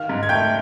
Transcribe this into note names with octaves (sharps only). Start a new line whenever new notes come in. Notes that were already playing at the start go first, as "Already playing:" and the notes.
Already playing: D#3 F5 F6
G#2
G#6
A3 G5 G6